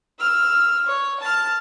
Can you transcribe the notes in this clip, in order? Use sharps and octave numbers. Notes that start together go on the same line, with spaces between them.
E6 F6
C#5
A5 F6